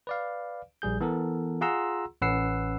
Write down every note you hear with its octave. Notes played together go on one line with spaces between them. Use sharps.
B4 D5 F5
A#1 G3 G#4 G6
E3 B3 A4 A#4
F4 G#4 F#5 A#5 C6 E6
A1 C#4 B4 F#5 E6 C7